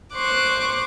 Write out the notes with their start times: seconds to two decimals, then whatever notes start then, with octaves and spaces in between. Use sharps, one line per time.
0.14 C5 C#6 D6 F#6